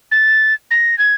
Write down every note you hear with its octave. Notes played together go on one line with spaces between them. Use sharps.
A6
A#6
G#6